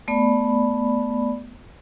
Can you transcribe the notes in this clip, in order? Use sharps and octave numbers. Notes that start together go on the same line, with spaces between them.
A3 B3 D5 B5